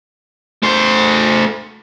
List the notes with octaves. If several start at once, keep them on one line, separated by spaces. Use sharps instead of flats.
A3 C5